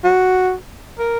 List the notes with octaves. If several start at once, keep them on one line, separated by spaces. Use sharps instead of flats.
F#4
A#4